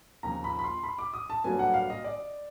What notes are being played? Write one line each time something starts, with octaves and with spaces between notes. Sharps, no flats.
D#2 C#3 F3 A#5
B5
B5
C6
B5
D6
D#6
A5
G2 D3 F#3 A#3 G#5
F#5
F5
D#5
D5